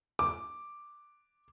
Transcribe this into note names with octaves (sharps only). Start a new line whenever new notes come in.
D6